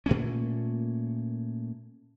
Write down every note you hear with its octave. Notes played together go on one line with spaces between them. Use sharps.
A#2 A3 A#3 C#4